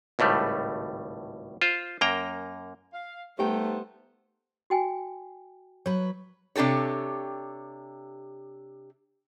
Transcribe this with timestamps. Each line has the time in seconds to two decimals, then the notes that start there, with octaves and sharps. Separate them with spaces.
0.19 G#1 C#2 A2 G3 A3
1.62 F4 C5
2.01 F#2 A#3 G5 A#5
2.93 F5
3.39 G3 A3 B3 D#4 G4 C5 G5
4.70 F#4 G5 G#5
5.86 F#3 B4 C#5
6.56 C3 D4 G4 A4 C#5